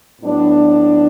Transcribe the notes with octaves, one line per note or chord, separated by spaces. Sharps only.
A2 F#3 B3 D4